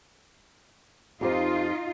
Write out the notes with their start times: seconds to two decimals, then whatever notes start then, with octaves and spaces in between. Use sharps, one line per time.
1.21 F2 D#4 F4 G4 C5